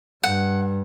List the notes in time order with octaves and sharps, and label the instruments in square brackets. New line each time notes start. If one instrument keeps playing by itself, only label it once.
[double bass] G2 [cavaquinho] F#5